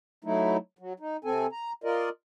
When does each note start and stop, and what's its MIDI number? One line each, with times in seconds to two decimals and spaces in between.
0.24 0.57 54
0.24 0.57 57
0.24 0.57 63
0.24 0.57 64
0.79 0.93 54
1.00 1.17 63
1.24 1.46 48
1.24 1.46 60
1.24 1.46 69
1.24 1.46 80
1.52 1.72 82
1.84 2.09 65
1.84 2.09 70
1.84 2.09 74
1.84 2.09 75